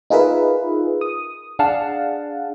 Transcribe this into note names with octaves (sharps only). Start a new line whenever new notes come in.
D#4 F4 G#4 A#4 B4 E5
D#6
D4 G#4 F5 F#5 A5